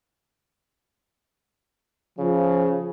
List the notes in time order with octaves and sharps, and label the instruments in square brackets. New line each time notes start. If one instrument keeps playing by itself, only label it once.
[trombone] C#3 [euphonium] F3